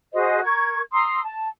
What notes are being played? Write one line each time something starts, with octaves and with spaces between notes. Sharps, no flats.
F#4 G#4 C5 D#5
A#4 C#6 G#6
A#5 C6 D#6 E6
A5